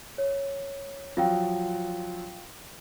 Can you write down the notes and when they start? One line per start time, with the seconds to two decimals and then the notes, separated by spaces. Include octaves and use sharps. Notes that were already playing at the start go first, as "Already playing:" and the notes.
0.18 C#5
1.17 F3 F#3 F4 F5 G5